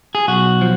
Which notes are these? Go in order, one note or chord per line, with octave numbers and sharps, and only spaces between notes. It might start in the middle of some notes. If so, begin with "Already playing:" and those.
G#4
B1 F#4
F3